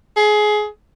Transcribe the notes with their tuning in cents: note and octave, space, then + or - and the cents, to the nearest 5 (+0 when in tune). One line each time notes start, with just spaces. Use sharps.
G#4 +20